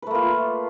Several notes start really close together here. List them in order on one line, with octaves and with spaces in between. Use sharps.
B4 A3 A#3 F4